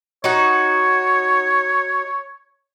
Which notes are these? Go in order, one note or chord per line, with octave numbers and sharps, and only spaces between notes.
D#4 F#4 C#5